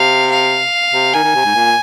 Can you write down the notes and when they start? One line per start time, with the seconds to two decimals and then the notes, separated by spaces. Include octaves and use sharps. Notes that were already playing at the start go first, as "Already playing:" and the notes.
Already playing: C3 F5
0.31 F5
0.93 C3
1.14 D#3 G#5
1.24 D#3
1.35 C3
1.45 G#2
1.55 A#2